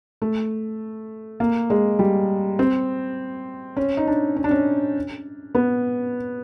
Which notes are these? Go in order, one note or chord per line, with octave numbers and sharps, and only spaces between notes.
A3
A#3
G#3
G3
C4
C#4
D#4
D4
C#4
D4
C#4
B3